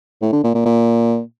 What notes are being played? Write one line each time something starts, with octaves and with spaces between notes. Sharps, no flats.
A2
D3
A#2
A#2
A#2